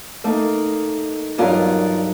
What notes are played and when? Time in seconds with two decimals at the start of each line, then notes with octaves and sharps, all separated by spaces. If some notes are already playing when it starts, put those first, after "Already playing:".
0.24 A3 A#3 D#4
1.38 E2 G2 F#3 D#4 F4 A#4